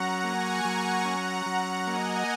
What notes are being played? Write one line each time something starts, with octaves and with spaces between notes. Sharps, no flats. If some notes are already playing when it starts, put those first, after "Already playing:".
Already playing: F#3 C#4 F#5 A#5
A#3 G#5 C#6
F#3
C#4 F#5 A#5
F#3
A#3 D#5 G#5